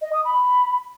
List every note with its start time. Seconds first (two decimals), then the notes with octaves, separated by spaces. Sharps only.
0.01 D#5
0.13 D#6
0.24 B5